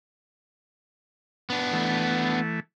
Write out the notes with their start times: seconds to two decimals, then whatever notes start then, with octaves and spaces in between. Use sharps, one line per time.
1.50 B3 D4
1.73 E3 A3